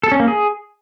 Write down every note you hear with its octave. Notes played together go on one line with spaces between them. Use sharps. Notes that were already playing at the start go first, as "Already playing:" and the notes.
A4
C#4
A#3
G#4